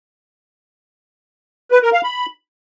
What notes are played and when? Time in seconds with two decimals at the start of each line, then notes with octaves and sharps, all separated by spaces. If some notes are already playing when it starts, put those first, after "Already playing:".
1.72 B4
1.82 A#4
1.93 F5
2.04 B5